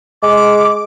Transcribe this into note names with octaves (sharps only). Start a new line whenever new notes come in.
G#3 D6